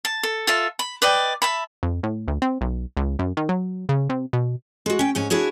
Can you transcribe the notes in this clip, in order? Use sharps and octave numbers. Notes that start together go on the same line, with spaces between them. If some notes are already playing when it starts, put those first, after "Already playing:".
A5
A4
F4 A4 E5
B5
B4 D5 D#5 G5
E5 A5 B5
F2
A2
D2
C4
B1
C#2
F#2
D#3
F#3
C#3
C3
B2
G#3 F#4
C#4 G5
G#2 C#4 G#5
D4 E4 F#4 G#4 C#5